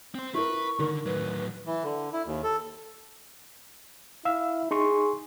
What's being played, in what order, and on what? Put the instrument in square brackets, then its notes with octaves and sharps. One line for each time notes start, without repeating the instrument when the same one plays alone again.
[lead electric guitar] C4 C5
[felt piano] E4 A#4 [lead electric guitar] B4 [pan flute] C#6
[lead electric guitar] D3 [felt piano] D#3 A#4
[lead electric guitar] A2 F#3 [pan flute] B4
[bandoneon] E3
D3
E4
D#2
A4
[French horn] E4 [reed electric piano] F5 E6
[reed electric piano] D#4 C6 C#6 [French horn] G#4